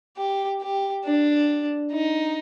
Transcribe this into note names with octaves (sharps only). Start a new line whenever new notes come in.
G4
G4
D4
D#4